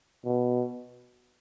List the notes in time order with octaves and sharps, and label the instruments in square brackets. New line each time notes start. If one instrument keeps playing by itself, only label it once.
[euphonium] B2